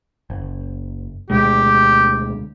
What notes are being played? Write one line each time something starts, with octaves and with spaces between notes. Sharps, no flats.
F#1
D2 B2 G#3 G4